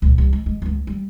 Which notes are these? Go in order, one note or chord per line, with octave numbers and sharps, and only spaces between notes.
C#2 A#2
C2
G#3
G#3
C#2 G#3
G3